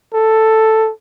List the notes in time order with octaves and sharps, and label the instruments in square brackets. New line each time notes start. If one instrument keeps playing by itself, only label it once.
[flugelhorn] A4